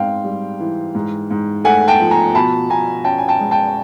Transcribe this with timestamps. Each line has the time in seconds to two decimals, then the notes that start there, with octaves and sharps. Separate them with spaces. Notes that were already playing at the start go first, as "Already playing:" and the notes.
Already playing: G#2 C4 F5 G5
0.24 G3
0.60 E3
0.95 G#2
1.30 G#2
1.64 A3 F#5 G#5
1.88 G5 A5
2.00 F3
2.11 G#5 A#5
2.34 B2 A5 B5
2.70 B2 G#5 A#5
3.04 C#4 G5 A5
3.18 G#5
3.28 G5 A5
3.40 G#3
3.51 G5 A5